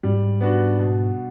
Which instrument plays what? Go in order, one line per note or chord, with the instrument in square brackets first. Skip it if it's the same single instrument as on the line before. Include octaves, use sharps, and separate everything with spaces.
[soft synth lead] G#2 [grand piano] G3
[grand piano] B3 D4 F#4
B2